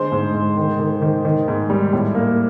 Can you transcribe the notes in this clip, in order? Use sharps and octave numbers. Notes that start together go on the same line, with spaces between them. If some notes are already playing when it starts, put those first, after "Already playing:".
Already playing: D3 G#3 C5 C6
G#2
G#2
D#3
D#3
D#3
D#3
G#2
G3
A2
A#3